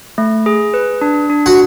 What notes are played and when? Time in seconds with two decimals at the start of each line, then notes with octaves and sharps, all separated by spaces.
0.18 A3
0.46 G#4
0.74 B4
1.01 D4
1.30 D4
1.46 F#4